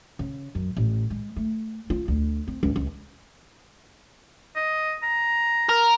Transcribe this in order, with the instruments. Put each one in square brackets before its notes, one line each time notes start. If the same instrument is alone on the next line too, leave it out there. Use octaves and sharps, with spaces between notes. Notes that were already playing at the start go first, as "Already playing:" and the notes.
[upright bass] C#3
F#2
A1
G#3
A3
F4
D2
C4
C#2
C#2
[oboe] D#5
A#5
[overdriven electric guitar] A#4